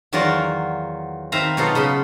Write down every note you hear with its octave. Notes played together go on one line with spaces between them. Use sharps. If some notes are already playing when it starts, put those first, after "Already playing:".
E2 D#3 F#3 F4 D5 A#5
D#3 C4 E5 F5 A#5 B5
B2 F#3 D#4 F4 A4
C#3 B5 C6